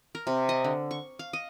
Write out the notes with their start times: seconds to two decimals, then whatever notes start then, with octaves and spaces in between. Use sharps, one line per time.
0.15 A#4
0.27 C3
0.49 D#5
0.64 D3
0.91 C#6
1.19 F5
1.33 D#5